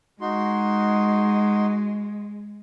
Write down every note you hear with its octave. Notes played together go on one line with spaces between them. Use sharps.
G#3 D#4 F#4 C6